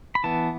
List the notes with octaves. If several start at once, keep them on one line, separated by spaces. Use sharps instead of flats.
B5
E3 B3 A5